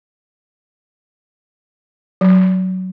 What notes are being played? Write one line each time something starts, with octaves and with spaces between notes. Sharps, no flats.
F#3